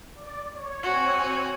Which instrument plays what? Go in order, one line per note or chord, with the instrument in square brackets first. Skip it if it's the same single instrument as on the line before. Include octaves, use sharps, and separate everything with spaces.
[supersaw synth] D5
C#5
[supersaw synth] C4 C#5 G#5 [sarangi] F#4